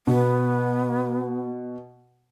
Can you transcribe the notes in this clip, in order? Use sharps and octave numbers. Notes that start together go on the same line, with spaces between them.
B2 B3